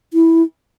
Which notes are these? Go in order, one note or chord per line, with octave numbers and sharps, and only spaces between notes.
E4